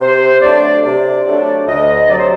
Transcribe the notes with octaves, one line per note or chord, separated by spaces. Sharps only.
C3 C5
F#3 A3 D4 D5
C3 D5
F#3 A3 D4
D2 D#5
C3 F#3 D5
C5